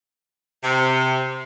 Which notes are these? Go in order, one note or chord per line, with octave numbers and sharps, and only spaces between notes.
C3